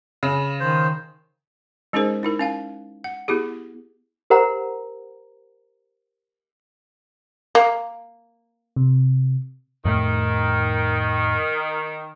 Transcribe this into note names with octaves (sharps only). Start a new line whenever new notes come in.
C#3
D#3 C5
G#3 C#4 D#4 G#4 A#4 C5
D#4 E4 A#4
C#4 F5 G#5
F#5
B3 E4 G4 G#4
G4 A#4 C5 F#5 A#5
A#3
C3
F2 A2 D#3 A3